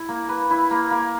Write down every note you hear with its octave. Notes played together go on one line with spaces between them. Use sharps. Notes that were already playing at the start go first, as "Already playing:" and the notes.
Already playing: E4
A#3
B4
E4
A#3
A#3